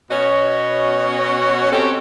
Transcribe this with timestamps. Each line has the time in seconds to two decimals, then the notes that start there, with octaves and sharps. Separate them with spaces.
0.10 B2 C#4 F#4 C#5 D#5
1.72 C4 C#4 G4 A4